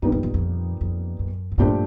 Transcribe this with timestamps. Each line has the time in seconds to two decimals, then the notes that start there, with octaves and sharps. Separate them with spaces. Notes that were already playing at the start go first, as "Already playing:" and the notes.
0.02 F#2 A#2 G3 B3 D#4 G4
0.12 F2
0.23 E2
0.34 F2
0.81 F2
1.19 F#2
1.52 G#2
1.58 G2 A#2 F3 A3 D4 G4